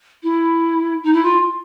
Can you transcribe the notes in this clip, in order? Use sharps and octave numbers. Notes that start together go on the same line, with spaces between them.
E4
D#4
E4
F4